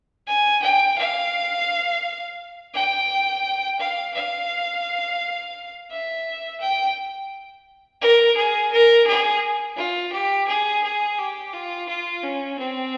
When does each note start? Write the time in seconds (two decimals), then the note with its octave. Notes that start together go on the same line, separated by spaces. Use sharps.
0.27 G#5
0.62 G5
0.98 F5
2.74 G5
3.80 F5
4.14 F5
5.91 E5
6.60 G5
8.01 A#4
8.36 G#4
8.72 A#4
9.06 G#4
9.77 F4
10.12 G4
10.48 G#4
10.83 G#4
11.18 G4
11.53 F4
11.88 F4
12.23 C#4
12.58 C4